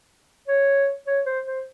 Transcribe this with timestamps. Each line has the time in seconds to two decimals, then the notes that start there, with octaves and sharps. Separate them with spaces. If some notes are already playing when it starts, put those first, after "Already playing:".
0.48 C#5
1.07 C#5
1.26 C5
1.46 C5